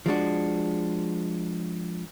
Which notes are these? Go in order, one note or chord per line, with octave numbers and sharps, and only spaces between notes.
F3 G#3 D4 F#4